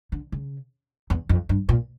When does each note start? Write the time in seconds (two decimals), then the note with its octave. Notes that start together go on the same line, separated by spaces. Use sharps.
0.12 D3
0.32 C#3
1.10 E2
1.29 F2
1.49 G2
1.69 A#2